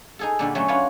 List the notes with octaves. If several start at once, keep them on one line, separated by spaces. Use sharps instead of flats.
D#4 G#4 A4
A#2 D3 G3
F#3 A3 C#4 E5
D4 F4 B4 C#5